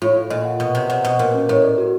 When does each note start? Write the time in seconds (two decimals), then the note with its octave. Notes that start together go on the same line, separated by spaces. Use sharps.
0.02 A2 F4
0.16 F4
0.30 A#2 D#5
0.45 F#5
0.60 B2 D#5
0.75 C3 F#5
0.89 C3 F#5
1.04 B2 D#5
1.19 A#2 A#4
1.34 C#4
1.49 A2 A#4
1.63 D5
1.78 F#4